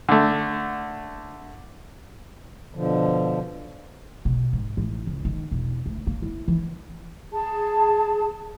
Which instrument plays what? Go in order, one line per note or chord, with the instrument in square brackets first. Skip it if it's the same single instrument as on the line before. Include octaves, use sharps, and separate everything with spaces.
[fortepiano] D3 A3
[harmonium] B2 D3 F3
[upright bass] B2
G#2
A1
C#2
D#3
E1
D2
A#3
E4
E3
[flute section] G#4 A5